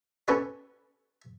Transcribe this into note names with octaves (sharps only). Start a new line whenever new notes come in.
C#4 G4 A4 B4 C#5 D5